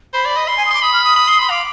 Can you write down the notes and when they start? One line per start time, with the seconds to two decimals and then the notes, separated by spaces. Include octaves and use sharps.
0.14 C5 B5
0.25 D5
0.37 D#5
0.48 B5 C6
0.57 G#5
0.65 D#6
0.71 C6 D6
0.82 B5 D#6
0.93 F6
1.04 D#6
1.16 B5
1.28 C6
1.39 B5 C6
1.50 F5 D6